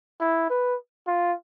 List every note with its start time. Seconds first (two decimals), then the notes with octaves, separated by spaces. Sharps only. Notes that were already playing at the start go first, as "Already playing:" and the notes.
0.21 E4
0.50 B4
1.07 F4